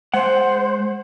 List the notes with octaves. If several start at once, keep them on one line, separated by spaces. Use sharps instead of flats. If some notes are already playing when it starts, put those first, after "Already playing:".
G#3 C5 F#5